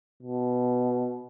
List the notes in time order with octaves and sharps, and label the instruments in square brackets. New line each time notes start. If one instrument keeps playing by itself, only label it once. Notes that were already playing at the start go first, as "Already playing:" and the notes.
[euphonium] B2